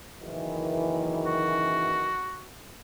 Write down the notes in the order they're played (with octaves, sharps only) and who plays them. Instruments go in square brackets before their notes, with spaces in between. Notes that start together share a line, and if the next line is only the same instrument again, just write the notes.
[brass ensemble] F#1 D#3 E3
[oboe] F#4